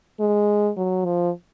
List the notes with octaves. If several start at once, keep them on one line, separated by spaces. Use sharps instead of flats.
G#3
F#3
F3